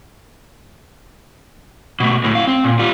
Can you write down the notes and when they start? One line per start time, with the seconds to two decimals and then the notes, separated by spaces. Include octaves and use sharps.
2.00 B2 A3
2.24 D2 A2
2.35 C4 F5
2.47 C4
2.64 A#2
2.79 G3 F4